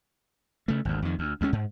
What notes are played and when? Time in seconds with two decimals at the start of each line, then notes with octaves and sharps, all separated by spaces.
0.68 C#3 A3
0.85 G#1 D2
1.02 F2 D#3
1.19 D2
1.41 D2 G#3 C#4
1.53 G#2